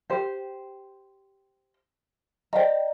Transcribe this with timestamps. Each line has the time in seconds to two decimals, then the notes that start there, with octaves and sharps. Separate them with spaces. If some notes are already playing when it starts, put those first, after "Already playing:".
0.10 G4 C5
2.53 C5 D5 D#5 G5 A#5